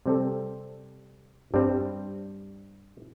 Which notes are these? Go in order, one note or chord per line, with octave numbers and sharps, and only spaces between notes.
C3 G3 C4 A4
G2 G3 C4